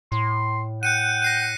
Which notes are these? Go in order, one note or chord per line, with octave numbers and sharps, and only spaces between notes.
A2 C6
F#5 G5 F#6 C#7 D#7
A#6 C7 D#7